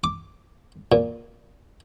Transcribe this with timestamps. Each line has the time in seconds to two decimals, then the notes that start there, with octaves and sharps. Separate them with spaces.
0.04 D6
0.92 A#2